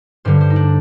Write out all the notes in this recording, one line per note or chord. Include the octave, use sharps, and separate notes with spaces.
G2 D3 G3 C5
C5
D#4
D4